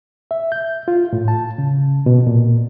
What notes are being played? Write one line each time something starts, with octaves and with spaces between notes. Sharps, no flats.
E5
G6
F4
A2
A5
C#3
B2
A#2